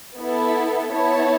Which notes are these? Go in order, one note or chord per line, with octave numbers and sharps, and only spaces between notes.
B3 E4 A4
B3 E4 C#5 A5